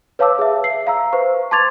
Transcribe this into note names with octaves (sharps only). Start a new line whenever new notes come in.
B4 C#5 F5 A5 D6 E6
G#4 E5
C7
F5 A#5 E6
B4 C5 C#6
A5 C6 D6 G#6 A6 F7